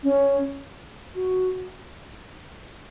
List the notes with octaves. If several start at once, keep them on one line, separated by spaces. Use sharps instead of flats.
C#4
F#4